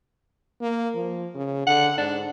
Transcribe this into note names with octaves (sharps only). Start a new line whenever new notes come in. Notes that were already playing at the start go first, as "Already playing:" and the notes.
A#3
F3
C#3
D3 F#5
G#2 D4